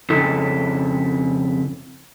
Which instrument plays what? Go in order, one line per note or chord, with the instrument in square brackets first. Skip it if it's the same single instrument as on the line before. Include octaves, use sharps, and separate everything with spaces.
[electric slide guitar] F2 C#3 E4 A4